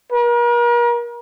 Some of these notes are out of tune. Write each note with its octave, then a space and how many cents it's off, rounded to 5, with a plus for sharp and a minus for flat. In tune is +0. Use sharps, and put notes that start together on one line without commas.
A#4 +40